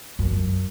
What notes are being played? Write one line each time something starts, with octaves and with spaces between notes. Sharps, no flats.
F#2